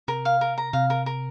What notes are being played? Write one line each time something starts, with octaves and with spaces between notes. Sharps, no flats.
C3 A#4
F5
A#4
A#5
C3 F5
A#4
A#4